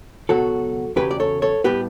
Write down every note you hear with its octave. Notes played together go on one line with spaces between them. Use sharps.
C#2 B2 F#3 F#4 A4
E2 C#3 F#3 G4 B4
D5
A4 C#5
A4 C#5
A2 G3 B3 G4 B4